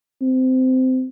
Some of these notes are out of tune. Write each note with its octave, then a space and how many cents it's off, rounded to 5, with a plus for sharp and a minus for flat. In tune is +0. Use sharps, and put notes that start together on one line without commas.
C4 -20